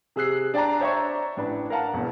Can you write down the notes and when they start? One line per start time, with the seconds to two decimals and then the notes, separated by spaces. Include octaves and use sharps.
0.16 C3 G#4 E6 F#6 C7
0.54 D4 D5 G5 A5 A#5
0.80 C5 C#5 E5 G5 A#5 C#6
1.37 A1 D4 B4
1.70 A#4 F5 F#5 A5 A#5
1.93 E1 E2